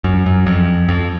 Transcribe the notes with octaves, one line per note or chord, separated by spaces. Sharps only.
F#2
F#2
F2
F2